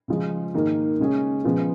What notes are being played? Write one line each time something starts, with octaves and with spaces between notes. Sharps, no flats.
C#3 F3 G#3
G#2 D#3 A#3 D#4
C#3 G#3 C#4 G#4
C#3 F3 G#3 B3